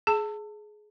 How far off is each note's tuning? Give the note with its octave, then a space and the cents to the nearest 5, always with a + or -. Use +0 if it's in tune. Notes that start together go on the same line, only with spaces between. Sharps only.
G#4 +20 A5 +30